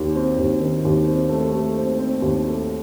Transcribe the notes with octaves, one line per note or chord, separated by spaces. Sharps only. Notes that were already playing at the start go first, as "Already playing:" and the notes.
Already playing: D#2 D#3
C4
D#2
D#3
D#2
C4
A3
A3
C4
C4
D#2
A3